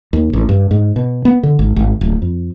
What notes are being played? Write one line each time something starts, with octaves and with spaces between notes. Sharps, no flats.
D#2
A1
G2
G#2
B2
B3
D3
G#1
G#1
D1
F2